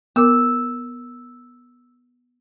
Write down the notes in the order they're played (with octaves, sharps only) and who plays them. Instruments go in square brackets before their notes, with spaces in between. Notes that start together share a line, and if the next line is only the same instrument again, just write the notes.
[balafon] B3 A#4 D6 [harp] E6